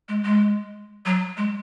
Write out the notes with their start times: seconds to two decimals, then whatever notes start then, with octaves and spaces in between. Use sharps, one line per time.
0.09 G#3
0.24 G#3
1.05 F#3
1.37 G#3